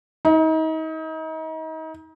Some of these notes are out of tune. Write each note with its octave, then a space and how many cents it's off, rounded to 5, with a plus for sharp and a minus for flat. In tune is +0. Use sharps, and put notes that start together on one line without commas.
D#4 +35